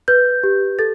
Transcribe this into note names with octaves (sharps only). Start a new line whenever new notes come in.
B4 G6
G4
A4 A6